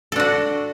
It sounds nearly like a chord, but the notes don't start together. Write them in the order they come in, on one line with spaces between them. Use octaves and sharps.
A4 D4 F#4